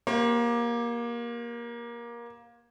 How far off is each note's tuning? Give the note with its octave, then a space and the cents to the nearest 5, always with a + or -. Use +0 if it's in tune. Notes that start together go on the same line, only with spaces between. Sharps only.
A#3 +20 G4 +0 C5 +45